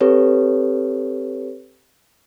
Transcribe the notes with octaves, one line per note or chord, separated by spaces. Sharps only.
C4 G4 A4 B4 C#5